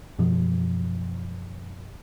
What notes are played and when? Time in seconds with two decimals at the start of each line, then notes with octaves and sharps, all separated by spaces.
0.19 F#2 B2 F3